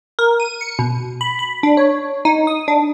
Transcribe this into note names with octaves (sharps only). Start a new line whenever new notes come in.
A#4
D#7
C#7
B2
B5
B5
D4
C#5
D#4
D#6
D4